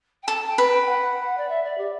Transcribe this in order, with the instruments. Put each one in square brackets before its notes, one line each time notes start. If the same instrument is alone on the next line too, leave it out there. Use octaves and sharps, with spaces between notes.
[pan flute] G5
[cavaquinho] A4 [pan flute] A5
[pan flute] G5
[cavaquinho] B4
[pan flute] G5
G5
F#5
D5
E5
D5
G4